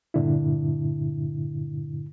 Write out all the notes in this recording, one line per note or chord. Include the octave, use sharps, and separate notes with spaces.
G2 A#2 D3 E4